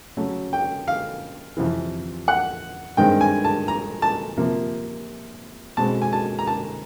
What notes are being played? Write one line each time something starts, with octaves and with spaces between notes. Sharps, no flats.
C#3 F#3 A3 C#4
G5
F5
F2 C3 E3
F#5
G2 D#3 G#3 C4 G5
G#5
A5
A#5
A5
C3 F3 A#3
B2 G#3 C4 A5
G#5
A5
A#5
A5